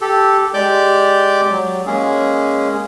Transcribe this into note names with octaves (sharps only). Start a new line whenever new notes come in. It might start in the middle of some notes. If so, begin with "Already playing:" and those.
G4 A4
G#3 G4 D5 D6 G6
F#3
G#3 A#3 C#4 G#4